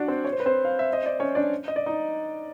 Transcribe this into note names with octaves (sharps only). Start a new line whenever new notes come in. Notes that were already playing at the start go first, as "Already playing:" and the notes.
Already playing: D4 F#4 D5 F#5
C4 C5
C#5
C5
B4
C4 C5
F5
E5
D#5
D5
C#4 C#5
D4 D5
D#5
D5
D#4 D#5